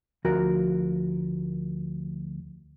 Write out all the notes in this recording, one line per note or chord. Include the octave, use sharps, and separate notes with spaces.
D2 F3 F#4 A#4 A#5